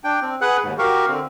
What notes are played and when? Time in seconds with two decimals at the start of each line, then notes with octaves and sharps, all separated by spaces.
0.04 D4 G5
0.22 C4
0.41 G#4 B4 F#5 F#6
0.63 D#2 G#2
0.79 F#4 G4 A#4 F5 C#6
1.08 D3 C4